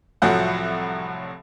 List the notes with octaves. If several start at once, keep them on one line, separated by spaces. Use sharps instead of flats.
C2 A2 F3 F#3 F#5